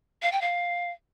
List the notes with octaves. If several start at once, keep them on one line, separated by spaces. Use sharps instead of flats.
F5
G5
F5